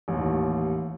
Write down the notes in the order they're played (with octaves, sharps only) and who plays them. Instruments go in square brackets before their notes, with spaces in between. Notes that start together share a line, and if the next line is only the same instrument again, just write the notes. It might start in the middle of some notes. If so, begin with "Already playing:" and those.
[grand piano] A1 D#2